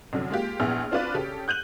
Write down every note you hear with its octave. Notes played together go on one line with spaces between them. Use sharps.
C2 F#2 D3 F#3
G#3 A#3 F4 G4
A#1 E2 B3 E4 G#4 F6
C4 D4 F4 F#4 B4 D5
C#3 G4 A4
F#6 G6 D#7 F#7